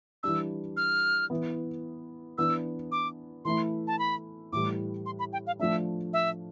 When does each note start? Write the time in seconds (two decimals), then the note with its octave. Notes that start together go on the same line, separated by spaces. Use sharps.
0.23 E3 G3 D4 E6
0.77 F6
1.30 E3 B3 E4
2.38 E3 B3 D4 E6
2.92 D6
3.45 E3 A3 E4 C6
3.87 A5
3.99 B5
4.53 A2 E3 G3 D6
5.06 C6
5.19 B5
5.33 G5
5.47 F5
5.60 F3 A3 D4 E5
6.13 E5